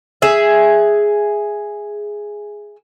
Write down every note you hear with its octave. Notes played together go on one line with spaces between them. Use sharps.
G#4 E5